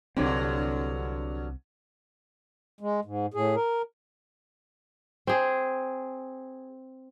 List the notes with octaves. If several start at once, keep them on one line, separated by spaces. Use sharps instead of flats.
C2 G2 D3 F#3 C4
G#3
G#2
A2 G#4
A#4
C4 G#4